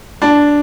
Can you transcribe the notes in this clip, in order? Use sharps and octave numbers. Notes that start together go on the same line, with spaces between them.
D4